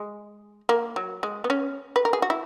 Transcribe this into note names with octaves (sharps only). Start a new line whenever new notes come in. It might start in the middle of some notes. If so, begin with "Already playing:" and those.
Already playing: G#3
A#3
F#3
G#3
B3
C#4
B4
A#4
G#4
F#4
E4